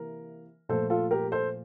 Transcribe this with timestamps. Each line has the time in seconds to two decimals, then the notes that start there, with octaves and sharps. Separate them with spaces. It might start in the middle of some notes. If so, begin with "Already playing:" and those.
Already playing: C3 E3 A#3 A#4
0.69 A#2 F3 A3 A4 C5
0.90 F4 A4
1.11 G4 A#4
1.32 A4 C5